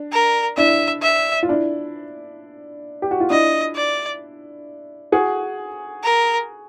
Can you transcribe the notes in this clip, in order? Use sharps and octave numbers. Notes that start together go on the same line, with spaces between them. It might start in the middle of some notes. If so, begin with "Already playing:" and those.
Already playing: D4
A#4
D4 E4 E5
E5
F4
D4 E4
G4
F#4
F4
D4 E4 D#5
D5
F#4 G#4
A#4